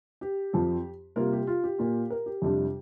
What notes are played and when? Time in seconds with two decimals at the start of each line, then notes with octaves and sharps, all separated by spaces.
0.21 G4
0.53 F2 F3 C4
1.16 C3 G3 A#3 F4 A#4
1.32 G4
1.47 F4
1.64 G4
1.78 A#2 A#3 F4
2.10 A#4
2.26 G4
2.42 F2 C3 G3 D4